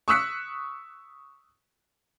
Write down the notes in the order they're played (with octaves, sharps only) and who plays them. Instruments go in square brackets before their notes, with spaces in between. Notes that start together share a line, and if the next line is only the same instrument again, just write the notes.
[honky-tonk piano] C#6 D#6 E6 F#6 B6 C#7